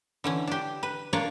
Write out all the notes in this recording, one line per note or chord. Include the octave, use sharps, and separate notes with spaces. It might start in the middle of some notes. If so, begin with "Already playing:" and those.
D3 E3 C#4
D4 G4
B4
A#3 D4 F4 C#5 D5